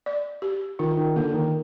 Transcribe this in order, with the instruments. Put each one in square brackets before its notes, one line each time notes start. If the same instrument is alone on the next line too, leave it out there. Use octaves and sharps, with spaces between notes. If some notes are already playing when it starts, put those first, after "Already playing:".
[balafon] D5
G4
[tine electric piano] D#3 [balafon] F4
[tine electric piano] D#3
[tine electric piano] D3 [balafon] A#3
[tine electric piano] D#3